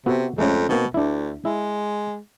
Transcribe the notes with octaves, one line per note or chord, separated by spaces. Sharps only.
C3 B3 F#4 A4
F2 G#3 A3 C#4
B2 A#3 C4 D#4
D2 D4 E4
G#3 E4